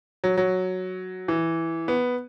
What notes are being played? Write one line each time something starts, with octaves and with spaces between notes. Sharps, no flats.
F#3
F#3
E3
B3